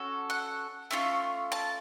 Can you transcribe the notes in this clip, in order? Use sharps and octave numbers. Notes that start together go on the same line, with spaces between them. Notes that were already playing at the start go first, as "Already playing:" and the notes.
Already playing: C#4 F#4 A4
F#5
A3 C#4 F4
A5